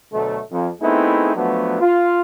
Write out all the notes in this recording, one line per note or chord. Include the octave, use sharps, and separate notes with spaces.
D2 B2 F#3 A3
F2
A3 B3 C4 D#4 E4 G#4
F3 F#3 A3 B3 D4 F#4
F4